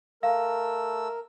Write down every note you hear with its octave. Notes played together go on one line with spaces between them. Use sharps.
A3 A#4 F5 E6